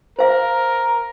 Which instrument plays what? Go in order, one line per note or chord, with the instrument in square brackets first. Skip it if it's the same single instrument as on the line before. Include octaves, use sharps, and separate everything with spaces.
[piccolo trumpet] A#4 [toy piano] C5 F5